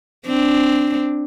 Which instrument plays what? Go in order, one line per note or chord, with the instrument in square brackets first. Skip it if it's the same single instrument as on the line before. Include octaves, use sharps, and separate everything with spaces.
[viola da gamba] C4 D4